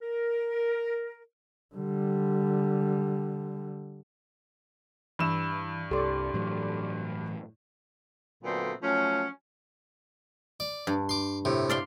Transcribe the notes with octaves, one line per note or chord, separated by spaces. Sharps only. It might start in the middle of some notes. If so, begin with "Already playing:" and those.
A#4
D3 G3
G2 E3 B5 E6 E7
C2 G4 A4 D5 C6 D6
A2 E3 F#3
A#2 D3 F#3 A3 B3 C4
F3 F#3 A3 C#4
D5
G2
C6 D6
A2 C3
D5 F5 C6